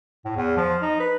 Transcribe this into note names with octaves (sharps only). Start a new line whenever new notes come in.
A2
E2
F3
D#4
B4